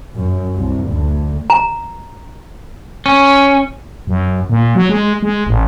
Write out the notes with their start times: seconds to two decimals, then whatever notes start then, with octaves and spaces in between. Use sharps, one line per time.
0.15 F#2
0.56 C2
0.88 D2
1.50 A#5
3.06 C#4
4.07 F#2
4.50 A#2
4.75 F#3
4.89 G#3
5.23 G#3
5.47 A1